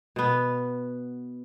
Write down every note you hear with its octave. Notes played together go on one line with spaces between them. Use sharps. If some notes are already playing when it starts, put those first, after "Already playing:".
B2 B3